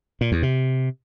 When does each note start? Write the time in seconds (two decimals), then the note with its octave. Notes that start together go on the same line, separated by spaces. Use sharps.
0.21 A#2
0.32 E2
0.43 C3